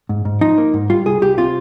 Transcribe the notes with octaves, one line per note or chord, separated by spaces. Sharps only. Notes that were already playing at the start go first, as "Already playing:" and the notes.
G#2
G#2
F3 D#4
A#3
G#2
G3 F4
C2 G#4
C2 G4
C3 F4